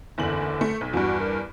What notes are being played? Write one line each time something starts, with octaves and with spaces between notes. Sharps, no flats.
F#1 E2 D3 F#7
A3
B1
E2 G2 F#4
A#4